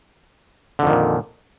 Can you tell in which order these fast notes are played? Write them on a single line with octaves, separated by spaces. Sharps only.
D3 F2 D#3 A#2